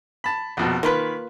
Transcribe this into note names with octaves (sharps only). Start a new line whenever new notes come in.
A5 B5
A#1 F2 B2
D#3 A#3 F4 B4 B5